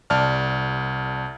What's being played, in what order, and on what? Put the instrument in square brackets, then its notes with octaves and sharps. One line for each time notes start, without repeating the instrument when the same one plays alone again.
[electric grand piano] C2 D5 A5 F6